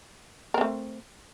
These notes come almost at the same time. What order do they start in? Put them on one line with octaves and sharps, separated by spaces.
A#4 C4 A3